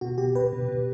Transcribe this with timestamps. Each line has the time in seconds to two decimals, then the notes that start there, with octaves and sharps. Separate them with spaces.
0.01 B2 F#4
0.18 B2 G4
0.35 B2 B4
0.53 B2
0.68 B2